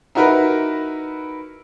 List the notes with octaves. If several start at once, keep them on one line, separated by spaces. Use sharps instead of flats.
D#4 E4 F#4 A#4 B4